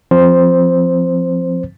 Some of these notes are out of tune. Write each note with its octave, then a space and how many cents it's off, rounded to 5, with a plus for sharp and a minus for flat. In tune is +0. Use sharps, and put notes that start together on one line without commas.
F3 +0 C4 +0 C5 +0